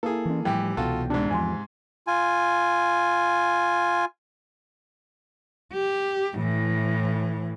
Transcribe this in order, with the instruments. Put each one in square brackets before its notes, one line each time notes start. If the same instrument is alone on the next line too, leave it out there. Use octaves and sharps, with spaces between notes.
[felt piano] A#3 E4 [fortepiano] G#4 A4
[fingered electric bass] E3 C#4
[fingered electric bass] A2 F3 G3 [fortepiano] E3 G4 [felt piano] G5
[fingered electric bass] C2 B2 E3 [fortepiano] F4 F#4 A4
[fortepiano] G#2 C3 [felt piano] D4
[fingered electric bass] E2 F3 [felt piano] G#5 C6
[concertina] F4 G#5
[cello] G4
A2 E3